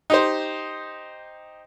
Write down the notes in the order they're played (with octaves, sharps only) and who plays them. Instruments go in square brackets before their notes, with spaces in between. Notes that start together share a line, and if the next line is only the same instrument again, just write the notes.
[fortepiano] D#4 G4 C5